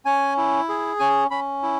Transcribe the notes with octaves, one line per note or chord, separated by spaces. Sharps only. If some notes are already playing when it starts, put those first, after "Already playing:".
C#4 G#5
E4
G#4
C#4 G#5
C#4 B5
E4